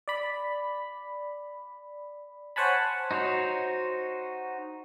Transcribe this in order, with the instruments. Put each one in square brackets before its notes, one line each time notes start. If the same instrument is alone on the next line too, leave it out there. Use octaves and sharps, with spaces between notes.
[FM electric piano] D5 B5
C5 C#5 F#5 G#5 A5 B5
[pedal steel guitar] D#4 F#4 C5 C#5